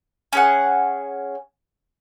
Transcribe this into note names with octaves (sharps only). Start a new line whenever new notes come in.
C#4 G#4 F#5